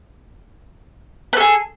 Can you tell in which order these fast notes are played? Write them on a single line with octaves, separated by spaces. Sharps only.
B4 A4 G#4